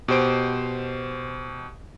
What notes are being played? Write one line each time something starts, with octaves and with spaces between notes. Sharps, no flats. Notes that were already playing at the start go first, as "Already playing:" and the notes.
B2 G4 C5 D7